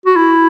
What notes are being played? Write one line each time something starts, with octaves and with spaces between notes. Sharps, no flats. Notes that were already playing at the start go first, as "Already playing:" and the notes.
F#4
E4